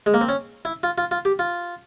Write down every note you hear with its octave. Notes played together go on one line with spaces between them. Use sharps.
G#3
A#3
C4
C#4
E4
F4
F4
F4
G4
F4